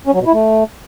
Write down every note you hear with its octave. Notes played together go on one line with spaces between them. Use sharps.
C#4
F#3
B2
E4
A3